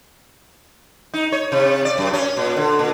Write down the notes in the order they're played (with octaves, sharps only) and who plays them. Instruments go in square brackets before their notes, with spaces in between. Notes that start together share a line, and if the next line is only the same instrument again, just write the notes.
[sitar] D#4
C#5
C3
D5
F#2
C#4
A#2
D3
A#2